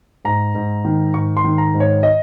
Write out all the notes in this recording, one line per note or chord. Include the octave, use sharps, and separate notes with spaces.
G#2 A#5
G#2
D#3
G#2 C#6
C6
D#3
A#5
G#2
C#5
D#5